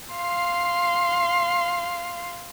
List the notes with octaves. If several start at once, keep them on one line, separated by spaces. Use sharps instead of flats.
F5 C6